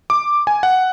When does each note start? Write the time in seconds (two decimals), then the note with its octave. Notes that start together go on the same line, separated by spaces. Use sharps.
0.10 D6
0.47 G#5
0.63 F#5